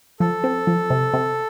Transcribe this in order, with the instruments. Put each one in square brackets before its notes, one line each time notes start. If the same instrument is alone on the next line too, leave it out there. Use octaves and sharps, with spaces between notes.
[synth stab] F3 [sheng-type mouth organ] A4
[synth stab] C4
F3
C3
C3